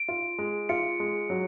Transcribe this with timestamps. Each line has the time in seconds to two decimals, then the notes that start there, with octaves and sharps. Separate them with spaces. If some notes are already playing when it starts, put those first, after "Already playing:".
Already playing: D7
0.08 F4
0.38 G#3
0.69 F4 C#7
1.00 G#3
1.30 F#3